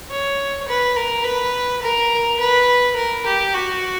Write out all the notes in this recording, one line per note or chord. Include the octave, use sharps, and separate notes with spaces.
C#5
B4
A#4
B4
A#4
B4
A#4
G4
F#4